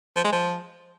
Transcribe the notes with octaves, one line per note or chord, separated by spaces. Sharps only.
F3
G#3
F3